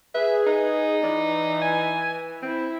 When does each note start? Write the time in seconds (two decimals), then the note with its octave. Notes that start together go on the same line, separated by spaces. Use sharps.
0.14 G#4 B4 E5
0.47 D#4 B4
1.03 E3 D5
1.61 G#5
2.43 C4 E4